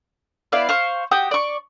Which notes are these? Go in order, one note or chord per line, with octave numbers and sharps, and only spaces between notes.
B3 E4 D5 F5
C5 F5 C#6
F#4 G4 G5 D#6
D5 C#6